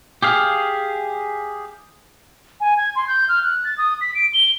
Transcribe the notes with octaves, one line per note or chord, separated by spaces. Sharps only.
G4 G#4 F5
G#5
G#6
C6
G6
F6
F#6
A6
D#6
B6
D7
G7